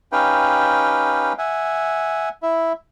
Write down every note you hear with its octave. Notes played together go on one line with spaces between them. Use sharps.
C#4 D#4 G4 B4 F5 G5
E5 F#5 G#5
E4 E5